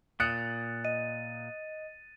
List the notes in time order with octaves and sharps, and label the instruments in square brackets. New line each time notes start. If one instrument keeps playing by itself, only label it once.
[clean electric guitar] A#2 [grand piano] D#6 F#6 C#7 [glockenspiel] A6
[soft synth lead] D#5 [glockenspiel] D#7